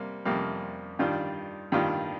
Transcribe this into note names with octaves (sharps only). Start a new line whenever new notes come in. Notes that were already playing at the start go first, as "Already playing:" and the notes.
Already playing: C3 G3 A#3
F2 C3 G3 A#3
G2 D#3 G3 D4 F4
G2 D#3 G3 D4 F4